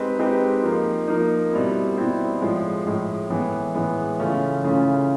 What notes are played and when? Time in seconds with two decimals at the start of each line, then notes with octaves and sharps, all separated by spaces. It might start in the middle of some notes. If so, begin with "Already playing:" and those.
Already playing: G#3 C4 D#4 G4 B4
0.19 G#3 C4 D#4 G4 B4
0.63 F3 A#3 D#4
1.07 F3 A#3 D#4
1.52 B2 G3 C4 E4
1.97 B2 G3 C4 E4
2.41 A2 F3 G#3
2.86 A2 F3 G#3
3.30 A2 E3 G#3 B3
3.75 A2 E3 G#3 B3
4.19 C#3 E3 A3 C#4 F4
4.64 C#3 E3 A3 C#4 F4